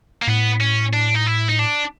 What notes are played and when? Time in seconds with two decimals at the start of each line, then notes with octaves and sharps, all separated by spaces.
0.22 A#3
0.27 A2 B3
0.61 C#4
0.93 D4
1.15 D#4
1.27 E4
1.49 D#4
1.59 D4